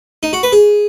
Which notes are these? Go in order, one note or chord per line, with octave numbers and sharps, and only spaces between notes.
D#4
F#4
B4
G#4